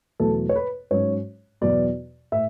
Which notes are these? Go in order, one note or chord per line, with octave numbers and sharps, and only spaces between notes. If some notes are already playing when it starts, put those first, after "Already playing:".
E2 B2 F#3 A3 A4
C#5
B4
G#2 F#3 C#4 C#5
E2 B2 F#3 B3 D5
A2 E5